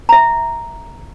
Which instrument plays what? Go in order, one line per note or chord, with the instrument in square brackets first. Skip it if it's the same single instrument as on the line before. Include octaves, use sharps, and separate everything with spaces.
[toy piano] E5 A#5